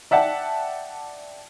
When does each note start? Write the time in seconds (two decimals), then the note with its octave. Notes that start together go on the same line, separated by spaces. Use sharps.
0.11 D5 E5 F#5 G5 A5